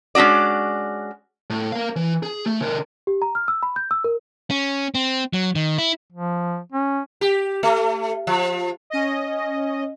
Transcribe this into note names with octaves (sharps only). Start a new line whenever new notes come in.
G#3 C#4 D4 F#4 D5
A2
A#4 F5
E3
G#4
A3
D3 A#4
G4
A#5
F6
E6
B5
G6
E6
A#4
C#4
C4
F#3
D#3
E4
F3
C#4
G4
A3
F3
C#4 D#5